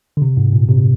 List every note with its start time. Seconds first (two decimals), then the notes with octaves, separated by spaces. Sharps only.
0.17 D3
0.22 C3
0.37 G#2
0.53 A#2
0.68 C3